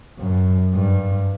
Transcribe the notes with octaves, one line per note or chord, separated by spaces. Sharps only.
F#2
G2